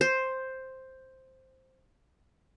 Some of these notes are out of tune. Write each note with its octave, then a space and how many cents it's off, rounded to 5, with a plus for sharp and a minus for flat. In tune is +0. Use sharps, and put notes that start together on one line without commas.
C5 +5